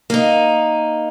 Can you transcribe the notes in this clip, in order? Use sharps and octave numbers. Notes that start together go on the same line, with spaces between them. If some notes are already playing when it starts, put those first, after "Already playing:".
A#3 D#4